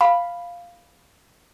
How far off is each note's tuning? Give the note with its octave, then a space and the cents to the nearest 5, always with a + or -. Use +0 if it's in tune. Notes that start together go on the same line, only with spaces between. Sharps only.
F5 +0 B5 +0